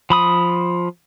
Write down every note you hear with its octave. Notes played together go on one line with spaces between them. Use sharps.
F3 B5 D#6